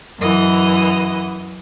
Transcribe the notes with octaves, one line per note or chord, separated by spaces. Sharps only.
F#2 E3 D#5 F#5